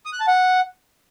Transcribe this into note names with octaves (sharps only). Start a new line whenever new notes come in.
D#6
F#6
A5
F#5